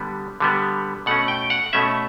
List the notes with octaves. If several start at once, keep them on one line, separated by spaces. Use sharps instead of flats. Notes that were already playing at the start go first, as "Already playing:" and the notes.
Already playing: D3 G3 B3
D3 G3 B3
B2 A3 C#4 F#5
G5
F#5
B2 A3 C#4 E5